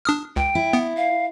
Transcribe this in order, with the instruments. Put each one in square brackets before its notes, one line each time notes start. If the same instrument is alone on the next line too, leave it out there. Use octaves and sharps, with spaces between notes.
[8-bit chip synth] D4 D#6 F6
[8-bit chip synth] C#2 [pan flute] G5
[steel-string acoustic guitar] E4
[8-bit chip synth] B3
[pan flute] F5